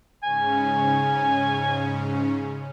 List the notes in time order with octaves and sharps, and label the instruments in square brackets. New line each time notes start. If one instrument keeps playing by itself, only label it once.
[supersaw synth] G#2 C#3 C#4 [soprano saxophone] G#5